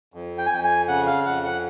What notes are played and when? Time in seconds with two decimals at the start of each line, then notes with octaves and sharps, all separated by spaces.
0.14 F2
0.38 G5
0.46 G#5
0.51 F2 G5
0.64 G#5
0.88 C#3 F#5
1.07 F5
1.26 F2 F#5
1.44 F#5